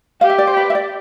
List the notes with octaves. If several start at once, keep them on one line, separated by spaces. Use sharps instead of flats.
G4 F5
E5
D5
C5
B4
E5
D5